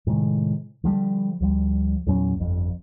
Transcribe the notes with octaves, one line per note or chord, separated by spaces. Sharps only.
A2 C3 D#3 G#3
D3 F3 G3
D2 F3 G3
E2 A#2 F#3 C#4
G1 F2